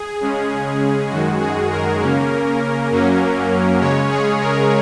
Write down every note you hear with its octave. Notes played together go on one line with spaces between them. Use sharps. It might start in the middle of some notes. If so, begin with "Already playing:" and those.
Already playing: G#4
C#3 G#3 C#4
F#2 D#3 G#3 F#4
G#4
A#4
C#3 A#3 C#4
F#2 F#3 A#3 C#4
C#3 G#3 C#4 C#5
G#4
A#4